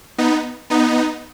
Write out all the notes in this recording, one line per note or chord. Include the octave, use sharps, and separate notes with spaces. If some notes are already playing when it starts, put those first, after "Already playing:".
B3 D#4
B3 D#4